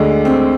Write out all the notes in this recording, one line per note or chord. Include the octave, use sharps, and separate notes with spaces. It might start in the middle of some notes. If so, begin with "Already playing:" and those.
Already playing: D2 D3 G#3
C4